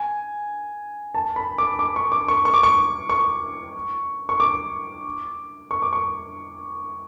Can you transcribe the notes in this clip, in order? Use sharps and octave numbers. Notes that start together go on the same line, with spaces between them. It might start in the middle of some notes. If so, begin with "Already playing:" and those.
Already playing: G#5
A5
B5
D6
D6
C#6
D6
C#6
C#6
D6
C#6
C#6
C#6
D6
C#6
D6
C#6